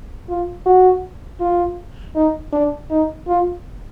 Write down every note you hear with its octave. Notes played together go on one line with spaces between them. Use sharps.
F4
F#4
F4
D#4
D4
D#4
F4